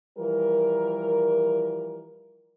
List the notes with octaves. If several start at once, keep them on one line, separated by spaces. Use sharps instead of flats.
E3 F3 G3 A#4